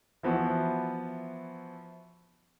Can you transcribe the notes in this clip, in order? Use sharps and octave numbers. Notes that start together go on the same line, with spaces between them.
E3 F3 B3 E4 F#4